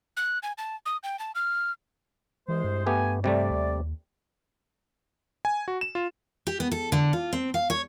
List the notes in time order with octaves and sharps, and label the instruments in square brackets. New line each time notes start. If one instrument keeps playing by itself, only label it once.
[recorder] F#6
G#5
A5
D#6
G5
A5
F6
[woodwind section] C2 G#3 C5 [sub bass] E3
[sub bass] G2
[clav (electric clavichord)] A3 B3 G4 [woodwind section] G#5
[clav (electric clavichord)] C3 G3 A3 [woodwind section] D5
[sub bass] D#2
[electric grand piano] G#5
F#4
E7
F4
[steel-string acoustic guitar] G4
B3
A4
D3
F4
C4
F5
C#5